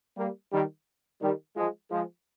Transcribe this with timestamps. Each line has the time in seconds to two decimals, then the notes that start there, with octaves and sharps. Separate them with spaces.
0.17 G3 A#3
0.52 D#3 G3
1.22 D#3 G3
1.57 F3 G#3
1.91 F3 G#3